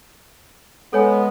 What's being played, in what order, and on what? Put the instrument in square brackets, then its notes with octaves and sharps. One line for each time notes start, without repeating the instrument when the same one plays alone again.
[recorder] G#3 [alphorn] B3 [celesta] A4 C#5 G#5